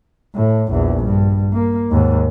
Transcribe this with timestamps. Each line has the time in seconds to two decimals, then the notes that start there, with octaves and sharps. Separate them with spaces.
0.35 A2
0.70 A#1 E2
1.04 G2
1.53 A#3
1.91 D#2 G#2